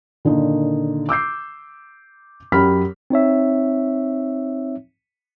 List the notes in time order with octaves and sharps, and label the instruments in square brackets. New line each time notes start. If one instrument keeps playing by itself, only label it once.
[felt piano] A#2 D3 D#3 D#4
D6 E6 G6 C7
F#2 F#3 G4 B5 F6 B6
[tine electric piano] C4 D#4 C#5 E5